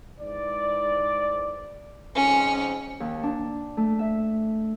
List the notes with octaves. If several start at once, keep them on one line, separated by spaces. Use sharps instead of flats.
G#2 E3 D5
F2 G#2 C#4
D#2
D4
A3
E5